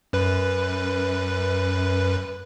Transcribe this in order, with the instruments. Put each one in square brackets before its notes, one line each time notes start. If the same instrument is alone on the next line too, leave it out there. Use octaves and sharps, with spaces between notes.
[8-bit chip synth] F#2 B4